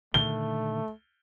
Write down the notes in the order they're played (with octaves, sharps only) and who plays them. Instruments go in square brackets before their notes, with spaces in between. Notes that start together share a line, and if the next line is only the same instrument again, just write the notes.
[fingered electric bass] A#2 D3 D#3 [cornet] A3 [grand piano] G7